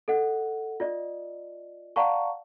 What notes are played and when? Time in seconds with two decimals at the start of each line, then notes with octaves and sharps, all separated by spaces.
0.08 A4 D#5 F#5
0.80 F4 D5 D#5
1.96 D5 F5 F#5 A5 A#5 C#6